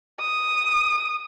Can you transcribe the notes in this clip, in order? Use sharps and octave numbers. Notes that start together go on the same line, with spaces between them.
D#6